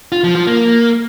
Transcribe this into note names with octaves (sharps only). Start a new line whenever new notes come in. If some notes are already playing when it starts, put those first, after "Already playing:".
F4
F3
F3
A#3